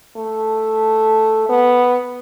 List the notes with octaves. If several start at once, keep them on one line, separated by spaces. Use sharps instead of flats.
A3
B3